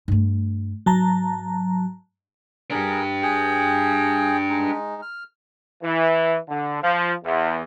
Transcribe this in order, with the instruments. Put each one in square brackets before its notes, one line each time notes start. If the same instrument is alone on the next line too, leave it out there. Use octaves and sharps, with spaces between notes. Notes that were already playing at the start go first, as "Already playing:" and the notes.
[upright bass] G2 A3
[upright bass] G#2 [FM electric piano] F#3 A5 A#5
[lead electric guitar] D4 G4 [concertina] G#4 A#4
[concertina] G#4 G5
G#3 D#4
F6
[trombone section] E3
D3
F3
E2